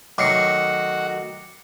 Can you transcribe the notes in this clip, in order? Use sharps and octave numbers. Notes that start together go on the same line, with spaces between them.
D#3 F#3 A3 F#4 D6 C7 C#7